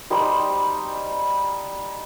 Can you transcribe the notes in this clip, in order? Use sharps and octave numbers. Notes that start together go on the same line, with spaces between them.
G3 D#4 C5